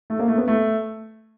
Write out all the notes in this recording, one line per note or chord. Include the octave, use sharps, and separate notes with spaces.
A3
A#3
A3
B3
A3